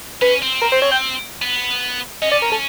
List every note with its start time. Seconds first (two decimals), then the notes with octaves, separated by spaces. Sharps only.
0.22 C#4 B4
0.42 C4
0.62 A#4
0.72 C5
0.82 C#5
0.92 G5
1.42 B3
2.22 C#4 D#5
2.32 D5
2.42 A#4
2.52 A4